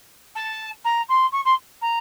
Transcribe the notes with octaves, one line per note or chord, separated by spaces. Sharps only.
A5
A#5
C6
C#6
C6
A#5